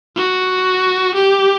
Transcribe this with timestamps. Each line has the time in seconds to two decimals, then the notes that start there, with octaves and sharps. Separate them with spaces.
0.16 F#4
1.15 G4